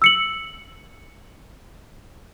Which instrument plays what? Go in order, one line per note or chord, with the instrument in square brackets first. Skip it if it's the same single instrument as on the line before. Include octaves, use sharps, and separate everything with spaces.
[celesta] E6 C#7 F#7